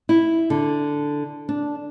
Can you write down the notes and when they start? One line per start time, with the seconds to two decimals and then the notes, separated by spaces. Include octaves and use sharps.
0.09 E4
0.50 D3
1.49 D4